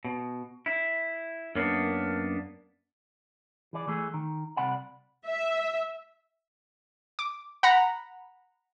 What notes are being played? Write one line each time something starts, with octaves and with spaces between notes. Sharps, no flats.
B2
E4
F#2 A#3 B3 D4
E3 G#4 D5
E3 A3 G#4
D#3
C2 C3 D5 F#5 B5
E5
D6
F#5 A#5 B5